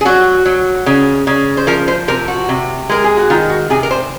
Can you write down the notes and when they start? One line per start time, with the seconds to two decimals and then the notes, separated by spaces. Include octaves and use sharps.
0.01 G#4
0.05 F#3 F#4
0.45 F#3
0.86 C#3
1.27 C#3
1.57 C5
1.67 F3 A#4
1.88 C5
2.08 C3 A#4
2.28 F#4
2.49 C3
2.89 G#3 A#4
3.04 G#4
3.17 F#4
3.30 D#3 F4
3.50 F#4
3.70 C3 G#4
3.83 A#4
3.91 C5